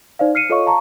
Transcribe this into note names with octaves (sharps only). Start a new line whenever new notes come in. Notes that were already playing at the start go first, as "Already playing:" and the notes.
D#4 C5 D5 F5
F6 C7 C#7 D#7
F4 A4 C#5 D#5 F5 C#6
F5 A5 A#5 C#6